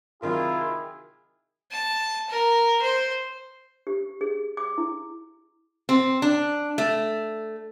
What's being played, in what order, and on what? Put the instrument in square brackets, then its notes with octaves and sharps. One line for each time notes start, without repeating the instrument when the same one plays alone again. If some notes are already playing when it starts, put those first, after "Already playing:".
[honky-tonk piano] C3 D#3 F#3 [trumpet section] E4 G#4 [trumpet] F4 [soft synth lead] A#4
[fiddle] A5
A#4
C5
[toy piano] G4
G#4
D6
E4
[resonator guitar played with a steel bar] C4
D4
A3